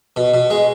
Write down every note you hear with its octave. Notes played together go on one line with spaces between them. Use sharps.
B2
B2
G#3